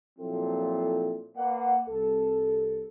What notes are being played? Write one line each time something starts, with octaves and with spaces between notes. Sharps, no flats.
A#2 F3 F#3 C4 E4 A4
A#3 B4 D5 F5 F#5
C2 A4